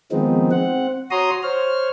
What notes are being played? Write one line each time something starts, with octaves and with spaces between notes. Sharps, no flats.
D#3 F3 G#3 B3 C4 D#4
C4 F#5
F#4 C#5 A#5 C6 D#6
C5 C#5 F6